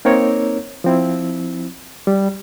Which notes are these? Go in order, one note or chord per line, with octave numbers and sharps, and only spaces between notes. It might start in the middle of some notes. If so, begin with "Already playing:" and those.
A#3 C4 D#4 A#4 C#5
F3 C4 E4
G3